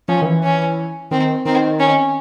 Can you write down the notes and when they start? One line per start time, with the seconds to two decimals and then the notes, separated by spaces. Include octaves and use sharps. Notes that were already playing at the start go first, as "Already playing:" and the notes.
0.08 F3 C#4
0.22 D#3
0.26 E3
0.43 C#4
1.11 D#3 C4
1.45 D#3 C4
1.80 C#4